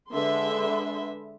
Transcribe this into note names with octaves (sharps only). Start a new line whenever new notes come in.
D3 G#3 B4 E5 C6